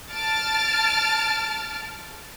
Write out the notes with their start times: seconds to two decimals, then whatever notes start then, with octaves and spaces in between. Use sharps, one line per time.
0.11 A5 F6 A6 D7